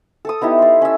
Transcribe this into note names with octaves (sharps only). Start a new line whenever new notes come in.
A4 A5 D#6
B3 D#4 E4 G4
D5 C6
C#4 E5